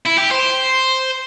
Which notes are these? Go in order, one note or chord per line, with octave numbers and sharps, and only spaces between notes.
E4
G4
C5